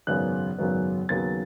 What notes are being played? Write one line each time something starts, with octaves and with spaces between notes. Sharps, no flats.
G#1 F#2 C#3 F#3 B3 F#6
G#1 F#2 C#3 F#3 B3
D#2 C#3 F#3 B3 A6